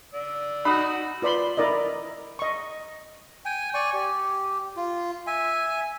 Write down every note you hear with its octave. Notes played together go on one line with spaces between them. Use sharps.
D5 E6
D#4 F#4 B5 D#6
F4 B4 D5 B5 C6
E4 A#4 D5 D#5
D#5 C#6
G5 G#5
D5 G#5 C#6
G4
F4
E5 G#5